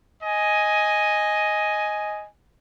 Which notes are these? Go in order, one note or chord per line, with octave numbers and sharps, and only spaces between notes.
D#5 G#5